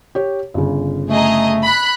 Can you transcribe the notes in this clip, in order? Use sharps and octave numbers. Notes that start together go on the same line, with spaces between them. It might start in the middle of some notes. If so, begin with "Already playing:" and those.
G4 C#5
G1 C#3
A3 G#4 D#5 A#5
B5 F#6